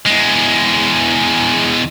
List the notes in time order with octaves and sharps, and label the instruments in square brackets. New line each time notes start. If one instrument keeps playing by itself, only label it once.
[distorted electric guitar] E2 G#3